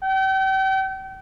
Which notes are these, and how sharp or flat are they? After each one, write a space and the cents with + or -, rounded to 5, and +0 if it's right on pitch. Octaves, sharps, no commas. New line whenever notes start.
G5 -40